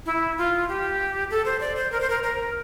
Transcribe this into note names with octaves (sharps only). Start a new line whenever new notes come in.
E4
F4
G4
A4
C5
D5
C5
A#4
C5
A#4
A#4